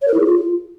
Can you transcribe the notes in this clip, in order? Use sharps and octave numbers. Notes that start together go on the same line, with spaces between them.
C#5
A#4
E4
G#4
F4